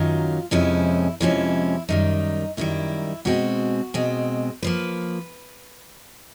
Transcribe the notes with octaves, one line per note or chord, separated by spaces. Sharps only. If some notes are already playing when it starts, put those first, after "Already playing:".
Already playing: F#2 D#3 F#3 F4
F2 C3 F3 G#3 C#4 E4
F2 C3 F3 G#3 C#4 E4
F#2 D#3 G3 D#4
F#2 D#3 G3 E4
B2 G#3 C4 F#4
B2 G#3 C4
F3 A#3 B4